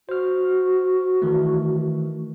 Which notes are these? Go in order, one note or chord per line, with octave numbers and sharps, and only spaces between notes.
F#4 C5 F6
D#3 E3 A3